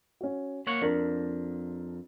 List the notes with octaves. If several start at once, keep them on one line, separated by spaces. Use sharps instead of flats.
C#4 F#4
A#3 C#5 F#5
F2 D4 A#4